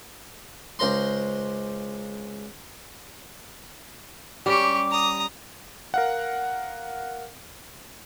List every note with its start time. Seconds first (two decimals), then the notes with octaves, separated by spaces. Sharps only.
0.79 C#2 C5 A#5 C6
4.46 G3 C#4 G4 C#6 D6
4.91 A#5 D#6
5.94 A#4 F5 F#5